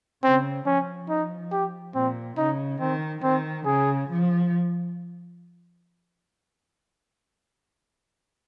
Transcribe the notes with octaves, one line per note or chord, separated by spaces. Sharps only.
C#3 C4
F3 C#4
D#4
G4
A#2 C4
C#3 D#4
D#3 C4
D#3 C4
C#3 G#4
F3